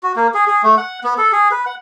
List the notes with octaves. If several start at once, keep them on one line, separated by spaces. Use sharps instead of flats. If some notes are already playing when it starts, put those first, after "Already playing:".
F#4
A#3
G#4
G#4
A3
F#5
B3
A4
G#4
B4
F#5